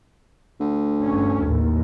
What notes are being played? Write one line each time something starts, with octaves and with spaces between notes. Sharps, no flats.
D2
G1 C#4
A1 D#2